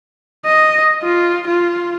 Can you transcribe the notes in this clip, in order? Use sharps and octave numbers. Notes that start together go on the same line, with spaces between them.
D#5
F4
F4